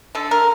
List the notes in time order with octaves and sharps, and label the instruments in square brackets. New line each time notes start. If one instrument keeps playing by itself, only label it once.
[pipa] D3 A4
A#4